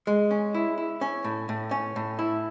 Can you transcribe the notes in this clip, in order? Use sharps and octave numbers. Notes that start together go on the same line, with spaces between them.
G#3
C#4
E4
E4
C#4
A2
A2
C#4
A2
E4